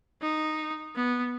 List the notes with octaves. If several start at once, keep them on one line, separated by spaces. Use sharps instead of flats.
D#4
B3